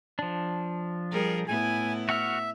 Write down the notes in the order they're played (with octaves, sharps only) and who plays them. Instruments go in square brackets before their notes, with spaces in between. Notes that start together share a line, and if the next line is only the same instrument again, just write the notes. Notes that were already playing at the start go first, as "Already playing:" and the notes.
[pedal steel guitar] F3 D4
[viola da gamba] G3 G#4 A#4
[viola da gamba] A2 B3 E4 [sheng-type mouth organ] G#5
[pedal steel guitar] F#4 F#5 F6 [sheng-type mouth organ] E5